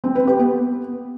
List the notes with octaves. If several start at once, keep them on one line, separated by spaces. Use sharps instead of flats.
C4
B4
G4
B3